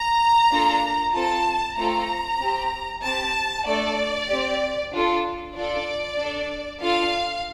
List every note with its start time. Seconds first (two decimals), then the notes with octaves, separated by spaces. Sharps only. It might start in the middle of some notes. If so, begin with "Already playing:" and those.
Already playing: A#5
0.50 A#3 D4 F4 A4
1.13 C4 F4 A4 A5
1.76 A3 C4 F4 A4 A#5
2.39 C4 G4
3.02 C4 G4 A5
3.66 A3 D4 A4 D5
4.29 C4 G4
4.92 D4 F4 A4
5.55 D4 F4 A4 D5
6.18 D4 A4
6.81 D4 F4 A4 F5